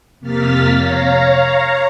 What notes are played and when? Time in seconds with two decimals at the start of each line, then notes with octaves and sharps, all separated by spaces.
0.19 F2 C3 A#3 F6 A6 B6
0.72 C#5 F5 A#5